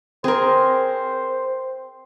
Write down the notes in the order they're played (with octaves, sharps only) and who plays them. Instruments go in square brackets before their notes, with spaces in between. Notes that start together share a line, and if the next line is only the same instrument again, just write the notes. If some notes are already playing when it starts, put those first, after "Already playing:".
[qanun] C4 [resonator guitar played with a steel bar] G#4 A#4 [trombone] C5